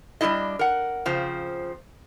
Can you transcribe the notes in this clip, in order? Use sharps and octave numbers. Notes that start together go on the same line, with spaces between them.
G3 B3 D4 E4 D#5
A#4 F#5
C#3 F3 C4